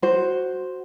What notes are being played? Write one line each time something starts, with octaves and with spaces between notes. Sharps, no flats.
F#4 C5